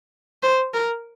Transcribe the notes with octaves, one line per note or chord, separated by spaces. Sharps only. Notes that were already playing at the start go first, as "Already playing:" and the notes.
C5
A#4